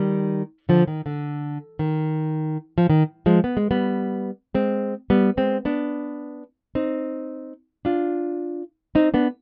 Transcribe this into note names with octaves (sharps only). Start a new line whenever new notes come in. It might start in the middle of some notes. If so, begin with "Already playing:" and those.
Already playing: D#3 G3
D3 F3
D#3
D3
D#3
F3
D#3
F3 G#3
B3
G#3
G3 B3
G#3 C4
G3 B3
G#3 C4
B3 D4
C4 D#4
D4 F4
C4 D#4
B3 D4